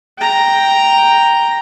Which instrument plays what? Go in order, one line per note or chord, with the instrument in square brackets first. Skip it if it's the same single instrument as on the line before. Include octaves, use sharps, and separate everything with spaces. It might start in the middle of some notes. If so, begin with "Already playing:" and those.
[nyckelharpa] G5 A#5